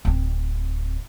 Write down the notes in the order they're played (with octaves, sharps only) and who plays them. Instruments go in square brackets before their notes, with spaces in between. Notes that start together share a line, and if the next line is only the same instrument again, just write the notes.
[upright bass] D1 C4